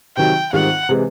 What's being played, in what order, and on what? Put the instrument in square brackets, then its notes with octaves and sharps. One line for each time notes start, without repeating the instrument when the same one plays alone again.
[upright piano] C3 D#3 F#3 [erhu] G5
[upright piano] G#2 D#3 G3 C4 F4 [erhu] F#5
[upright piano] C3 E3 G#3